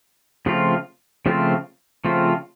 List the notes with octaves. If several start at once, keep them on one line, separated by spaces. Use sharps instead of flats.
C#3 F3 A3 C4 F4
C#3 F3 A3 C4 F4
C#3 F3 A3 C4 F4